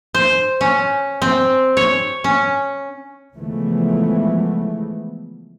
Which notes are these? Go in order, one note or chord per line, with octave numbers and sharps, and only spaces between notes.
C5
C#4
C4
C#5
C#4
C#3 E3 F3 G#3 A3 B3